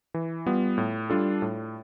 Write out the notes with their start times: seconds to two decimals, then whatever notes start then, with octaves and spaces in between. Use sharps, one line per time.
0.14 E3
0.46 G3 B3 F4
0.78 A2
1.10 G3 D4 F4 A4
1.42 A2